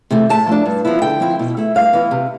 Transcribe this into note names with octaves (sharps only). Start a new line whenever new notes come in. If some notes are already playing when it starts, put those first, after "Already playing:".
C3 E3 A3
A2 A5
F3 A3 D4
G2
F3 B3 E4
D3 G5
F3 C4 E4
B2
A3 E4
G2 F5
E3 B3 E4
C3